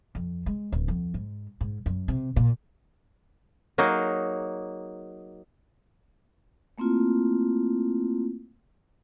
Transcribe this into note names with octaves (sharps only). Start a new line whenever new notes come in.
F2
G#3
D1
F2
G#2
G#2
F#2
C3
A#2
F#3 A#3 D#4 G#4
A3 A#3 C4 E4 F4